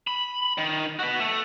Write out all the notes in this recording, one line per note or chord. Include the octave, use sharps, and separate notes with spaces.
B5
D#3
F#4 B4
A3